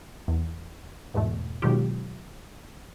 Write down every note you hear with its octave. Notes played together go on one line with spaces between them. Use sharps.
E2
E2 G#2 B2 A3
B2 D#3 F#3 G#3 F4 G4